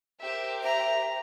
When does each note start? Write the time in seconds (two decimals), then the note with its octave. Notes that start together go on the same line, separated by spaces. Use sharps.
0.21 G4 A#4 C5 E5
0.63 E5 A#5